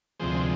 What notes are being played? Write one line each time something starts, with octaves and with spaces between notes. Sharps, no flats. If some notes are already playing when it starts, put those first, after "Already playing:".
D2 C3 F3 G#3 C5